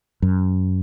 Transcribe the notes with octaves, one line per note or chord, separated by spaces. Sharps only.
F#2